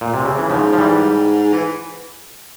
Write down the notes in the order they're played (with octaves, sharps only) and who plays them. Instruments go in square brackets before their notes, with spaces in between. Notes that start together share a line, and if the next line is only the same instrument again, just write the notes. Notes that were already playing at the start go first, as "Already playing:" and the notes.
[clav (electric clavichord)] A#2
C3
C#3
E3
[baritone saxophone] G#2 [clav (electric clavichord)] C#3 F3
[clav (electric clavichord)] F3
E3 G3
[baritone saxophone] E3